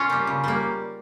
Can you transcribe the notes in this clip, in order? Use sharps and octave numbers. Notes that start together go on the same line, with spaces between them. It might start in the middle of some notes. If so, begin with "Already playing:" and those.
Already playing: C#4 F4
G3 A#3
C#3
G3 A#3